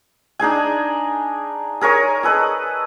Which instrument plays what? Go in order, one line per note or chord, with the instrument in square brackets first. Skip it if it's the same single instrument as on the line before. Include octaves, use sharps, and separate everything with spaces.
[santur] D4 D#4 G#4 G#5
G#4 A#4 C#5 G#5
G#4 A4 B4 D#5